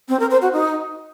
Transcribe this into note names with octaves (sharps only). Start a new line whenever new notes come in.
C4
A#4
C5
F#4
D#4